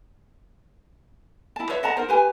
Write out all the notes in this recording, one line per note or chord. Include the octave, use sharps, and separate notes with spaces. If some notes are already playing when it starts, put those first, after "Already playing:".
E4 A5
B4 C#5 E5
D#5 F#5 A5 A#5
D#4 A#4 C5
G4 B4 G#5